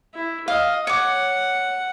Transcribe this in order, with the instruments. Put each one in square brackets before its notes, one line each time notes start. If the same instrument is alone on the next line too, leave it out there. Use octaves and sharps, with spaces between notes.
[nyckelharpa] E4
[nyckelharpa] D#5 [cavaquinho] F5
[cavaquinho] C#5 D6 [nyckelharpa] F#5